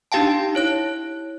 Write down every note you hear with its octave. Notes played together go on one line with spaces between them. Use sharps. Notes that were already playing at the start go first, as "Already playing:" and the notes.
D4 D#4 G4 F5 G5 A5
E4 C#5 F#6